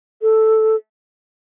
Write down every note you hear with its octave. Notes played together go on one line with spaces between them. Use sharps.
A4